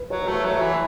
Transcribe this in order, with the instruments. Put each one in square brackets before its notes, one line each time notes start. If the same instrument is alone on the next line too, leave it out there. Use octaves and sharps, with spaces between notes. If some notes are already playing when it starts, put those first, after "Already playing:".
Already playing: [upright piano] B4
[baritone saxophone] F#3 [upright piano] C#5
[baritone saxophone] A3 [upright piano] C#5
[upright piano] E5
[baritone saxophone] F#3 [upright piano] C#5
[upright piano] E5
[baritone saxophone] E3